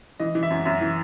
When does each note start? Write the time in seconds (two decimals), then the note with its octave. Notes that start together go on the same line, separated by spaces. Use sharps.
0.20 E3 D#5
0.35 E3
0.43 E5
0.50 F#2
0.65 F#2 E5
0.81 E3